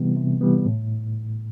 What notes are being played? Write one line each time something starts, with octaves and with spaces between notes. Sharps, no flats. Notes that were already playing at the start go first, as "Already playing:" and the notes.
Already playing: C3 E3 G3 B3
C3
E3 G3 B3
A2